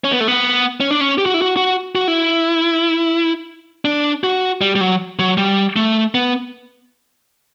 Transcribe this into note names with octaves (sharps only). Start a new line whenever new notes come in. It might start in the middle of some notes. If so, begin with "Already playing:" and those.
C#4
B3
A3
B3
C#4
D4
C#4
G4
F#4
E4
F#4
F#4
F#4
E4
D4
F#4
G3
G3
F#3
F#3
G3
A3
B3